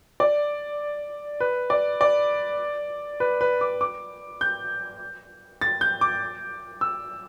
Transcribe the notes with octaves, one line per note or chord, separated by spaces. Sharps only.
D5
B4
D5
D5
B4
B4
D6
D6
G6
A6
G6
D6
E6